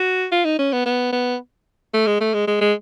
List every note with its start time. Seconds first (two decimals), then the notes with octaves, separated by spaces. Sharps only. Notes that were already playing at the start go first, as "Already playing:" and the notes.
Already playing: F#4
0.32 F4
0.45 D#4
0.59 C#4
0.72 B3
0.86 B3
1.12 B3
1.94 A3
2.07 G#3
2.21 A3
2.34 G#3
2.47 G#3
2.61 G#3